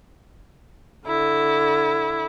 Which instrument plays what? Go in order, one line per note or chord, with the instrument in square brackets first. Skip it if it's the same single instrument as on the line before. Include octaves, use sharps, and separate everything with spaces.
[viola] D3 [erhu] E4